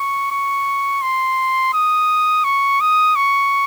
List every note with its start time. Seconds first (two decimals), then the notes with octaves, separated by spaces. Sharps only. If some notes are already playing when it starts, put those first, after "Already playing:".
Already playing: C#6
0.31 C#6
1.02 C6
1.74 D#6
2.44 C#6
2.81 D#6
3.16 C#6